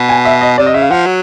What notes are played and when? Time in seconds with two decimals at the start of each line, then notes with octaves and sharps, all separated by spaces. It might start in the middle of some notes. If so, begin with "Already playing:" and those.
Already playing: B2
0.09 G#5
0.25 E5
0.41 D#5
0.58 C3 D5
0.66 D#5
0.74 C#3 E5
0.82 F5
0.91 F3 F#5
1.06 F#3